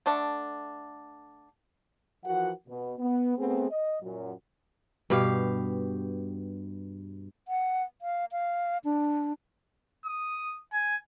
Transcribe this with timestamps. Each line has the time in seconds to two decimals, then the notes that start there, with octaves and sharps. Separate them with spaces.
0.06 D3 A3 D4
2.25 E3 F3 F#4 A#4 F#5
2.69 B2
2.99 B3
3.37 A3 B3 C4 G#4
3.71 D#5
4.03 F#2 A#2 F#3
5.10 G2 B2 G4 F5
7.48 F#5
8.02 F5
8.32 F5
8.84 D4
10.05 D#6
10.73 G#5